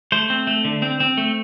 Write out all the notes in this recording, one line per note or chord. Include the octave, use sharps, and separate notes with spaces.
A3 C5
C4
A3
D3
C4
C4
A3